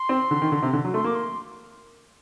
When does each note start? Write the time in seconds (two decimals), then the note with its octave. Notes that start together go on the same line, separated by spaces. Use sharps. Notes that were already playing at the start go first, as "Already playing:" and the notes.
Already playing: C6
0.09 C4
0.31 D3
0.42 D#3
0.52 D3
0.62 C3
0.73 D3
0.84 F#3
0.94 A3 C6
1.04 A#3 D6
1.15 C6